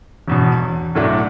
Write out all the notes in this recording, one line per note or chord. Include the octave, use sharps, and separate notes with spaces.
E1 E2 B2
B1 A2 F#3 A3 D4